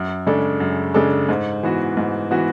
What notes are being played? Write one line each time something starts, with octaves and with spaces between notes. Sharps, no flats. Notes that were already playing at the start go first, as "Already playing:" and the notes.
Already playing: F#2
C#3 G#3 D4 A4
F#2
C#3 G#3 D4 A4
G#2
E3 B3 F#4
G#2
E3 B3 F#4